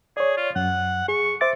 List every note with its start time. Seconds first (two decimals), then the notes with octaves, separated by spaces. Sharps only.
0.17 G#4 C#5 D5
0.37 F4
0.56 F#2 F#5
1.08 G#4 C#6
1.41 C5 E5 D6 A6